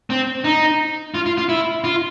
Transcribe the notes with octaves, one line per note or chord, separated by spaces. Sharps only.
C4
D#4
F4
F4
F4
E4
F4